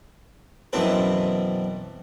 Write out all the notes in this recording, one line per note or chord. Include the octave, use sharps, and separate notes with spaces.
F#2 B2 E3 C4 B4 A5